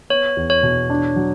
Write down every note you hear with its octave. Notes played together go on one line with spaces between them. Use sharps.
B3 C#5
E2
C#5
B2
D4
F#3